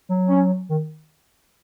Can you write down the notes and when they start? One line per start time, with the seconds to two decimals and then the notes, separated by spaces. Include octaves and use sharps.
0.09 F#3
0.29 C#4
0.69 D#3